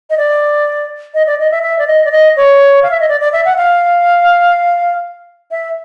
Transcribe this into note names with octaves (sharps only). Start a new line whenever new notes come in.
D#5
D5
D#5
D5
D#5
E5
E5
D5
D#5
D5
D#5
C#5
F5
E5
D#5
D5
D5
E5
F#5
F5
E5